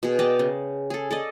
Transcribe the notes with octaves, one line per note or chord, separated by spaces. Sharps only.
B2 G#4
D5 D#5 G5 A5
C#3
G#4 A4
A4 D5 D#5